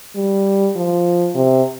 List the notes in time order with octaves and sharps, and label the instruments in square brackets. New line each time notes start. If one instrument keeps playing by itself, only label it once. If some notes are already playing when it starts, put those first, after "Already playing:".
[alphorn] G3
F3
C3